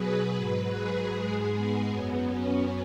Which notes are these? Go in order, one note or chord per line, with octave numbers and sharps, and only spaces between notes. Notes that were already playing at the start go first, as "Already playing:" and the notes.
Already playing: B2 F#3 G#4 B4
F#3
G#2
G#4
G#2 G#3
B3
F#2 F#3
C#4